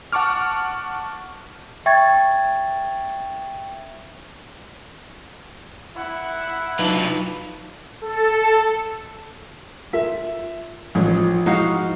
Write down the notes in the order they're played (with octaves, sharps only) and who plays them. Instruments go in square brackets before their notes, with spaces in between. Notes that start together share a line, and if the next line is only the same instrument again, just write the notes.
[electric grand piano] F#5 A5 C#6 D6 F6
[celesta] E5 G5 C#6 G#6 A6
[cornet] E4 [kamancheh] F#5
[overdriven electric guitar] F#3 F4 [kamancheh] D4 [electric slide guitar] D#4 B4
[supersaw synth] A4
[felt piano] F4 A#4 [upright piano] E5
[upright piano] A1 [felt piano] E3 F3 [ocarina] F4
[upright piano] G#2 [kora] D#4 F#4 F5 [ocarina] E4